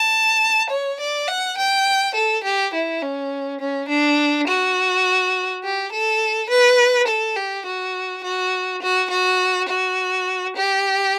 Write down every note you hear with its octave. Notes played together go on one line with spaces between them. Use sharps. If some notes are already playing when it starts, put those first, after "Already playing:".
Already playing: A5
C#5
D5
F#5
G5
A4
G4
E4
C#4
C#4
D4
F#4
G4
A4
B4
A4
G4
F#4
F#4
F#4
F#4
F#4
G4